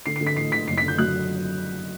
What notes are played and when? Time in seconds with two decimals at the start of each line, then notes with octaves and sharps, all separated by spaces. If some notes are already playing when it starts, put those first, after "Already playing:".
0.06 D3 C7
0.16 C7
0.21 D3
0.27 B6
0.37 A1 C7
0.52 D3 B6
0.68 F#1 C7
0.78 B6
0.83 D3
0.88 G6
0.98 F#3 F#6